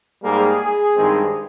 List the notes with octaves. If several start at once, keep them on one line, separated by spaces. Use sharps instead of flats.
G#2 G3 A#3 G#4
G2 D#3 G#3 C4